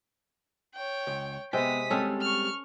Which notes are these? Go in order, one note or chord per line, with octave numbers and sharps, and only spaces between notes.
C#5 G5
C#2
C3 G#3 B3 G5 D#6 B6
G3 G#3 C4 C#4 A4
C#6 F6